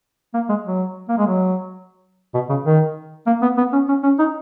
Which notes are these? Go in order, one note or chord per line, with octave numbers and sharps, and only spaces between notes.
A#3
G#3
F#3
A#3
G#3
F#3
B2
C#3
D#3
A#3
B3
B3
C#4
C#4
C#4
D#4